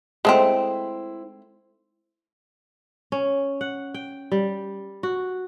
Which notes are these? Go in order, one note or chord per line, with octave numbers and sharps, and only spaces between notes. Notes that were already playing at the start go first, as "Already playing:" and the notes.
G#3 A3 C4 E4 C5
C#4
F#5
G5
G3
F#4